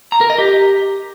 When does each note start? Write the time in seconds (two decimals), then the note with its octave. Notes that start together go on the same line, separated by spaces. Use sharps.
0.12 A#5
0.21 A#4
0.30 D#5
0.38 G4